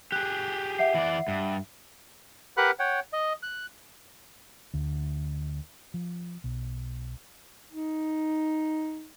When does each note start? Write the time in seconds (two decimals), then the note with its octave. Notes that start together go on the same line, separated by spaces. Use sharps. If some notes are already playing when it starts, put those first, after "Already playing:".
0.12 G4 G#4 F#6
0.79 E5 F#5 C7
0.94 E3 D5
1.28 G2
2.57 G4 A#4 B4 F#5 B5 F#6
2.79 C#5 F#5 G5
3.13 D#5
3.43 F#6
4.74 D2
5.94 F3
6.44 B1
7.72 D#4